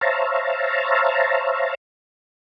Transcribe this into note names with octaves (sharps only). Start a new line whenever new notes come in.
C5 C#5 E5 F5 A5 A#5